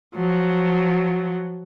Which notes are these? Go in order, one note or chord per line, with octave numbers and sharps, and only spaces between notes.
F3 F#3